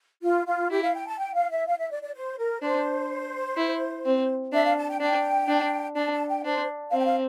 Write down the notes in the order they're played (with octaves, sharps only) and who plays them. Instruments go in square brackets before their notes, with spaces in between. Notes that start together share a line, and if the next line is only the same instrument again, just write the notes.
[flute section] F4
F4
[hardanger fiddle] E4 [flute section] G4
[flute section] F5
G5
A5
G5
F5
E5
F5
E5
D5
D5
C5
A#4
[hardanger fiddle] D4 [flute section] C5
[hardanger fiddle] E4
C4
[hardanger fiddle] D4 [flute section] E5
[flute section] F5
A5
G5
[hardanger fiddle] D4 [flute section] G5
[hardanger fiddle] D4
[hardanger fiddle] D4 [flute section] A5
[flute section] A5
G5
[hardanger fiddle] D4 [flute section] C5
[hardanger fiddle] C4 [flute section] F5
[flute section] G5
F5